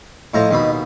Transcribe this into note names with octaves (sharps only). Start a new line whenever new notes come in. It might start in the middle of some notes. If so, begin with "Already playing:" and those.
A2 F3 D#5 A#5
D#2 B2 B5